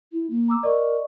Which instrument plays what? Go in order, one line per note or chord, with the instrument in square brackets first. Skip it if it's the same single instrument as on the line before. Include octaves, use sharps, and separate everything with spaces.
[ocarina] E4
A#3
[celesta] A#5 D6 E6
[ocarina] A#4 [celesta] D5 D#5 C#6